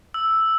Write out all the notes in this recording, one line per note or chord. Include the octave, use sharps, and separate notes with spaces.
E6